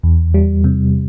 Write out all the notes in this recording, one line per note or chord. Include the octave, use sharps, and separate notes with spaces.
E2
G3
C3